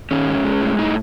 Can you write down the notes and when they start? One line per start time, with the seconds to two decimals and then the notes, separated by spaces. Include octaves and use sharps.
0.11 D#3 C#4
0.27 G#2
0.44 G#3
0.61 A2
0.79 A2 D#4